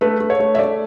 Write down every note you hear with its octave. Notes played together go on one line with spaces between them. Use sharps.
A3 B4
A3
C#5
A3
E5
A3 D5